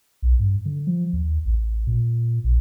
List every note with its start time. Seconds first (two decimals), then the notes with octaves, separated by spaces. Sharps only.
0.22 B1
0.39 G2
0.66 D3
0.87 F3
1.13 D#2
1.46 A1
1.87 A#2
2.44 A#1